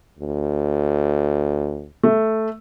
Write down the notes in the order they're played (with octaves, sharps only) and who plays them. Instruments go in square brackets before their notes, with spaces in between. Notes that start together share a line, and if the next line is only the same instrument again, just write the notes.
[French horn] D2
[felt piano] A3